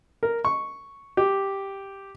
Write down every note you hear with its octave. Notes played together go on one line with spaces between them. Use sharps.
A#4
C#6
G4